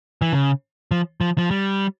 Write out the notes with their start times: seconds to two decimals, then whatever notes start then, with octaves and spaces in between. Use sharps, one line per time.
0.22 E3
0.33 C#3
0.91 F3
1.21 F3
1.38 F3
1.51 G3